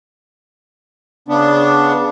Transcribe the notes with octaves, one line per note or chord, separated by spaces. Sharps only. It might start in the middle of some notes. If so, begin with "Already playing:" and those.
C#3 B3 D4